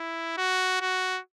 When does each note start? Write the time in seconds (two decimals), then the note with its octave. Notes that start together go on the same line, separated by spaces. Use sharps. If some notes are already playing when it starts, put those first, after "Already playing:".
Already playing: E4
0.37 F#4
0.81 F#4